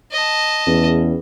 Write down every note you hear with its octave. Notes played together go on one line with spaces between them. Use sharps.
D#5 A5
E2 C#4 G#4 B4